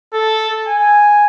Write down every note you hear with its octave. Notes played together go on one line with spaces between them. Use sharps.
A4
G#5